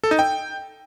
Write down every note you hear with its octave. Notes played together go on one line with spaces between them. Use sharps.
A4
D#4
G5